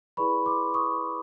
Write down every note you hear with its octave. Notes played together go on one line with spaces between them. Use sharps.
E4 G#4 B4 D5 B5 C#6
C6 D6
C#6 D#6